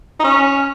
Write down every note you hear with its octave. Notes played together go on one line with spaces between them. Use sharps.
D#4
C#4